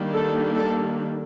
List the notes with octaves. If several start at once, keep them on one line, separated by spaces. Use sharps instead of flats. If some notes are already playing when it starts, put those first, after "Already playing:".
Already playing: D#3 G3 A#3 D4
A4
A4